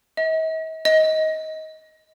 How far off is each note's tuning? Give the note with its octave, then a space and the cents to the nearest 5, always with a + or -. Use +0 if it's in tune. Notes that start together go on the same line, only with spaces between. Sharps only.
D#5 +45
D#5 +20